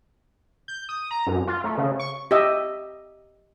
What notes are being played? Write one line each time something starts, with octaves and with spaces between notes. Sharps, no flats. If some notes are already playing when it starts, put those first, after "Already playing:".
G6
D#6
A#5
F#2
F4
A3
C#3
C#6
G4 D#5 E5